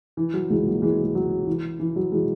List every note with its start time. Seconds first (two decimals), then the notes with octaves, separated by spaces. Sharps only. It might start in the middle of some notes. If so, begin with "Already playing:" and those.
0.17 E3
0.34 F#3
0.50 C#2 E3 G#3
0.66 F#3 A#3
0.82 E3 G#3
1.04 G#3
1.15 C#2 F#3
1.47 E3
1.80 E3
1.96 F#3
2.12 E3 G#3